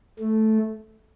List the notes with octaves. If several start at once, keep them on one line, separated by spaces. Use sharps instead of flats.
A3